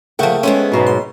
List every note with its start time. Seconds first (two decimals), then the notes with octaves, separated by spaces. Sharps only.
0.19 C#3 F3 A3 A#3 F#5 G5
0.43 G#3 A3 B3 C#4 C5
0.72 G#2 B2 F#3
0.87 C6